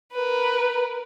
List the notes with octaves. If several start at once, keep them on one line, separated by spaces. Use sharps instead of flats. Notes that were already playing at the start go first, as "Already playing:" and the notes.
A#4 B4